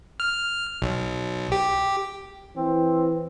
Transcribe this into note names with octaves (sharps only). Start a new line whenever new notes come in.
F6
B1
G4
E3 C4